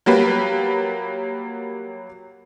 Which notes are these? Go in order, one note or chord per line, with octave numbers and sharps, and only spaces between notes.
F#3 G3 A#3 G4 B4